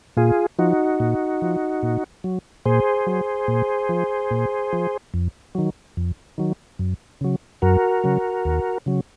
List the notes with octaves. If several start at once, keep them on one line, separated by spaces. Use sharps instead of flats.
A#2 F4 G#4
F3 D#4 F#4
A#2
F3
A#2
F#3
A#2 G#4 C5
F#3
A#2
F3
A#2
F3
F2
D#3 F#3
F2
D#3 F#3
F#2
C#3 F#3
F#2 F#4 A#4
C#3 F#3
D#2
C#3 F#3